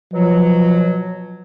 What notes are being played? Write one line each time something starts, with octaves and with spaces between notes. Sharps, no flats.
B2 F3 F#3